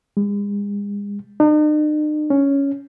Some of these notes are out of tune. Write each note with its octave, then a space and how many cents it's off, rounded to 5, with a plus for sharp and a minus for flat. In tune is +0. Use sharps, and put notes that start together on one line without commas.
G#3 -40
D#4 -45
C#4 +5